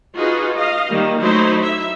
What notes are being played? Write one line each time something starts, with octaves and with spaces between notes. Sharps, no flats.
D#4 F4 F#4 G#4 B4
D#5 F5
D#3 G3 A#3
F#3 A3 D#4 E4 C5
E5